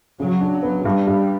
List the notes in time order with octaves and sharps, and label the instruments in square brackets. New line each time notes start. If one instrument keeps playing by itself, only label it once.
[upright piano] C#3 [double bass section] F#3
[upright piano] D4
B3
[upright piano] G2 [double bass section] G3
[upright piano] G2